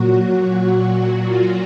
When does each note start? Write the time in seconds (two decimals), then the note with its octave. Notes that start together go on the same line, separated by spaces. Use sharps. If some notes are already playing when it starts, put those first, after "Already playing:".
Already playing: A#2 F#3 F#4
1.23 F4